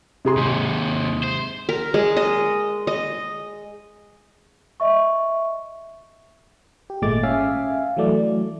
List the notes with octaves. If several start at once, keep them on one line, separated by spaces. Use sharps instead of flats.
C3 G#4 C6
D#2 G#2
C5
A#4
G#3
D#5
D#5
D#5 E5 C#6
G4
G#1 A#2 G#3 A3 D6 A6
C#4 E5 F5 G#5
E3 F#3 A3 D5